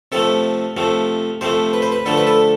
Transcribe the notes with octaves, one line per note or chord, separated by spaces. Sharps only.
C3 F3 A3 A4
C3 F3 A3
C3 F3 A3 C5
B4
C5
B4
D3 F3 A3 A4
B4
A4